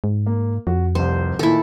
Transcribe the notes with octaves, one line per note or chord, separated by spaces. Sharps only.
G#2
A#3
F2 F#4
F1 C2 C5
A#2 D#3 E4 A4